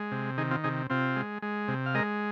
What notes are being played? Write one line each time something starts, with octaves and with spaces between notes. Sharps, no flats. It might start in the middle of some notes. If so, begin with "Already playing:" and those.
Already playing: G#3
C3
D#3 D#4 G#4
C4 F4
C3 D#4 G#4
C3 C4 F4
G#3
G#3
C3
F5
G#3 A#4 D#5